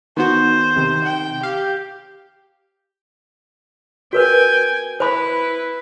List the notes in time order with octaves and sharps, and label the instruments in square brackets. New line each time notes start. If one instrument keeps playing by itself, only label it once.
[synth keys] D#3 B3 F#4 [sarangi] C5
[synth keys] C3 D#3
[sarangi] G5
[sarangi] G4 [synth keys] F5
[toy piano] F#4 A#4 B4 [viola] G5 G#5
[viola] E4 B4 [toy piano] C5 B5